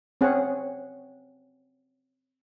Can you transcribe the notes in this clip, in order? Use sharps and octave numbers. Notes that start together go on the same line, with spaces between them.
C4 C#4 G#4 F#5